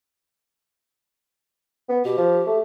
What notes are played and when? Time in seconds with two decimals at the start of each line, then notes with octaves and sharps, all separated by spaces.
1.89 B3
2.05 B2 G4
2.17 F3
2.46 A3